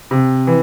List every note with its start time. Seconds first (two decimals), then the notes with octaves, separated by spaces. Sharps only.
0.11 C3
0.47 E3